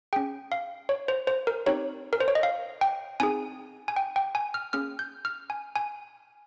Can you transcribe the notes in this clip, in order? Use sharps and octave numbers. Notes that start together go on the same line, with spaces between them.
C#4 G#4 G5
F5
C#5
C5
C5
A#4
C4 D#4 G4 C#5
A#4
C5
C#5
D#5
F5
G5
C4 D#4 G#4 G#5
G#5
G5
G5
G#5
F6
A#3 C#4 G#4 F6
G6
F6
G#5
G#5